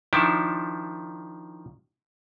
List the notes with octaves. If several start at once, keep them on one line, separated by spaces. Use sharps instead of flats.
D#3 F3 D4 E4